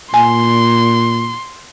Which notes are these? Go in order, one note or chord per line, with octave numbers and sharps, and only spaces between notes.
A#2 G#5 C6